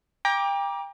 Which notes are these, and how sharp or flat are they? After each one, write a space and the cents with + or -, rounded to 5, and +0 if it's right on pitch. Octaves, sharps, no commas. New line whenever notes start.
G5 +30 A#5 +30 D6 +0